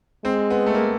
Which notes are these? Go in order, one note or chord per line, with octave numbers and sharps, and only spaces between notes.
G#3 C4
B3
A3
A#3